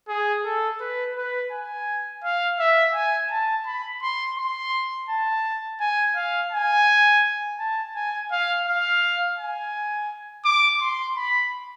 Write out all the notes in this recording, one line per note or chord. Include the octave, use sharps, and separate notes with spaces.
G#4
A4
B4
B4
G#5
F5
E5
G#5
A5
B5
C6
C6
A5
G#5
F5
G#5
A5
G#5
F5
F5
G#5
D6
C6
B5